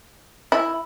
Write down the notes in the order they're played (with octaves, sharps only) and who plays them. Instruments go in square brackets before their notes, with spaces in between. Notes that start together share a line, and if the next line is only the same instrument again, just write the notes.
[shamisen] E4